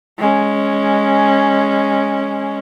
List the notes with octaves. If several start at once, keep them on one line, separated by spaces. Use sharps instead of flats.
G#3 C#4